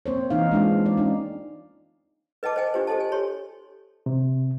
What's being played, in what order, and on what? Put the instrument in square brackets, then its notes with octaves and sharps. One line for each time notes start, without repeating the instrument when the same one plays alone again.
[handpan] A#3 C4 C5 C#5
E3 D#4 F5
G#3 D4 F4
D5
C#4 D#4
[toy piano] B4 D#5 G5 A5 D6
C5 D#5 G5 G#5
D4 F4 G4 C5
G4 A4 C5 D#5 A5
G#5
G4 C#5 C6
[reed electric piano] C3